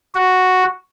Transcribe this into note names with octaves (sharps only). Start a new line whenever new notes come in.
F#4